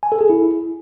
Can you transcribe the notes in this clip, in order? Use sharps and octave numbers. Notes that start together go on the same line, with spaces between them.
G#5
A4
G#4
E4